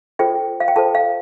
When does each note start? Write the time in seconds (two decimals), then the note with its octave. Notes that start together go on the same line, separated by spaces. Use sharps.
0.19 F4 A4 C5 G5
0.60 F5
0.68 G5
0.76 F4 A4 C5 A5
0.95 F5